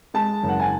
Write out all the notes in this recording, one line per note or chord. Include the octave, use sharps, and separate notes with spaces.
G#3 A5
F#1
F#5
G#5